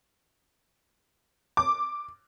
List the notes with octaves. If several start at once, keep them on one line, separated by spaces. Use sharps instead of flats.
D6